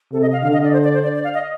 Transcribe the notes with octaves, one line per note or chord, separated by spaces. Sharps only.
C3 A4
D#5
F5
D3 F5
D#5
D5
C5
D5
C5
D5
D5
F5
D#5